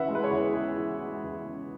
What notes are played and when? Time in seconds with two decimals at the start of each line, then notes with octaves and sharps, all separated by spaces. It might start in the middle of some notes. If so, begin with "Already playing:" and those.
Already playing: E3 C#4 B4 E5 F#5
0.08 G#3
0.15 B4
0.23 G#4 C#5
0.31 E2
0.53 C#4 E4 G#4
0.77 E3
1.00 G#3
1.23 E2
1.46 C#4